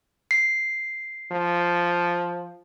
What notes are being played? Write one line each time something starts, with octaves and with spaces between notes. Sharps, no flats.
C7
F3